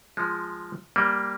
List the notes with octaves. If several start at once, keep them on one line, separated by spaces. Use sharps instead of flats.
F3 G#3
G3 A#3